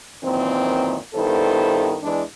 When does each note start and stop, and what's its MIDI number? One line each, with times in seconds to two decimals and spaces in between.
0.23 0.96 42
0.23 0.96 46
0.23 0.96 51
0.23 0.96 52
0.23 0.96 60
1.15 1.97 43
1.15 1.97 51
1.15 1.97 59
1.15 1.97 64
1.15 1.97 69
1.15 1.97 72
2.03 2.22 40
2.03 2.22 52
2.03 2.22 56
2.03 2.22 62